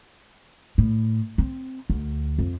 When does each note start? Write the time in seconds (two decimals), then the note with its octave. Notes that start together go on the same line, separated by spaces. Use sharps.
0.78 A2
1.38 C4
1.90 D2
2.39 F2